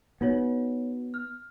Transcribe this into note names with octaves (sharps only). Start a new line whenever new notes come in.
B3 D#4 F#4 C#5
F6